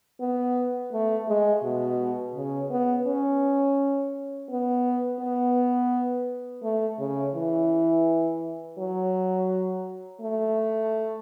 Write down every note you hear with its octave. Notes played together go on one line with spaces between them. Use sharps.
B3
A3
G#3
B2
C#3
B3
C#4
B3
B3
A3
C#3
E3
F#3
A3